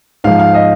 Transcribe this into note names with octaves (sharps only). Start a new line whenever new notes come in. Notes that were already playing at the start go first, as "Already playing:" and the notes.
G#2 F3 F5
F5
D#5